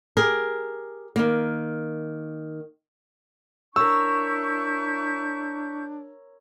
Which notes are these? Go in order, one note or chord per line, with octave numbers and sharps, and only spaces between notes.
G4 G#4 A#4
D#3 A#3
D4 E4 A#4 C#5 C#6 E6 G6